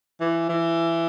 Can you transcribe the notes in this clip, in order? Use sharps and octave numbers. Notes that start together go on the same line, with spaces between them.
E3
E3